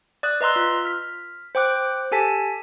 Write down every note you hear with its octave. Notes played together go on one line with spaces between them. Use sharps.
D5 D#6 F#6
B4 D#5 A#5 C6 E6
F4
F6 B6
C5 G5 D6 F#6
G4 A4 G#5 A5 B6